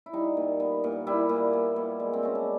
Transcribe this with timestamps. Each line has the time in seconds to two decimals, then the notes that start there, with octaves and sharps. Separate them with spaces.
0.06 E4
0.13 G3 D#4
0.37 A#2
0.60 B3
0.84 A#2
1.07 G3 E4
1.29 A#2
1.53 B3
1.76 A#2
2.00 G#3
2.13 C4
2.23 B2 C#4
2.35 D4